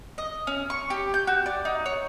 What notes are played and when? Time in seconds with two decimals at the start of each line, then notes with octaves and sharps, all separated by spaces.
0.18 D#5
0.47 C#4
0.70 C#6
0.90 G4
1.14 G6
1.27 F#4
1.46 D5
1.65 D#4
1.86 C#5